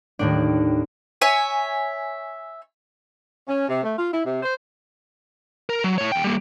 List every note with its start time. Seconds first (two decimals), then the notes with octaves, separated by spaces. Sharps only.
0.19 D#2 A2 D4
1.22 C#5 E5 G#5
3.48 C#4
3.69 C3
3.83 A3
3.98 F4
4.12 E4
4.25 C3
4.43 C5
5.69 A#4
5.84 F#3
5.98 A2 C#5
6.12 E2 G5
6.24 G3 A#3